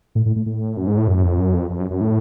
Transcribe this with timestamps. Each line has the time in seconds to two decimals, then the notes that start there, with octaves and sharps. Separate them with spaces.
0.15 A2
0.26 A2
0.36 A2
0.46 A2
0.77 F#2
0.87 G#2
0.97 A2
1.08 F#2
1.24 F2
1.39 F#2
1.54 F2
1.70 F2
1.80 F#2
1.91 F#2
2.01 A2